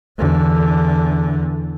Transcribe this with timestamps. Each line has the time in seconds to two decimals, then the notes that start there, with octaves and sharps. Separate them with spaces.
0.18 E2 D3